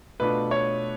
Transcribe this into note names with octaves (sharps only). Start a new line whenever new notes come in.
B2 A3 D4 F4 B4
C#5